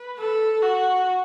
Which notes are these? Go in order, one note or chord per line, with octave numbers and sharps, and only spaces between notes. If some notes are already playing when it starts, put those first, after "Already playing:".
Already playing: B4
A4
F#4